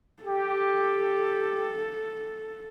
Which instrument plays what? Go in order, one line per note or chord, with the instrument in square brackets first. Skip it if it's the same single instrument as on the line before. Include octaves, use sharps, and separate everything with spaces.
[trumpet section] G4 [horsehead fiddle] A4